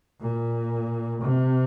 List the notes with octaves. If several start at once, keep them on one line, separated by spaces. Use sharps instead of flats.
A#2
C3